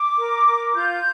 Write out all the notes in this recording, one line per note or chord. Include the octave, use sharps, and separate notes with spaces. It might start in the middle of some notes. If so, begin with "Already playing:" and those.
Already playing: D6
A#4
A#4
F4 G6